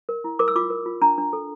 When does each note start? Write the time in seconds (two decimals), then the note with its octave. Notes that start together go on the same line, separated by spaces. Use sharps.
0.09 A#4
0.24 E4
0.39 A#4 D6
0.48 E6
0.56 F4 D6
0.70 A#4
0.86 F4
1.02 D4 A#5
1.18 D4
1.33 A4